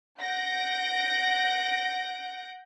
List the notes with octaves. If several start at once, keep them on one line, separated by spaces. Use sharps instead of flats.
F#5 G6 A#6 D7